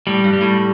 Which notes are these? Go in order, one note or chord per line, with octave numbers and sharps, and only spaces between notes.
A2 G3
G2
G3
A2